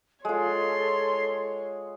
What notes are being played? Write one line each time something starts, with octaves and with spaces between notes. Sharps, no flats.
G#3 F4 A4 C#5 C6